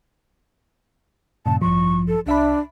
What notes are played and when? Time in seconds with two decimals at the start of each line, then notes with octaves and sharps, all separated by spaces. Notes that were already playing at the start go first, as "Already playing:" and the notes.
1.46 G2 A#2 C#3 A5
1.62 A1 G2 F3 C#6
2.08 A4
2.26 C2 D4 E5 B5